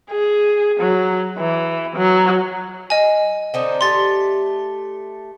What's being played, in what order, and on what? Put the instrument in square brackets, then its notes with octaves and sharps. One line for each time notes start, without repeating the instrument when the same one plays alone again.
[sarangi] G#4
F#3
E3
F#3
[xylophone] D#5 G#5
[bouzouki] D3 C4 D#4
[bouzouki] A3 G4 [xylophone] C6 A6